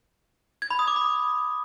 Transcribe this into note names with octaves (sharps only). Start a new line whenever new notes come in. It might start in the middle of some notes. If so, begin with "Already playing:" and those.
G#6
B5
D#6
D6
B5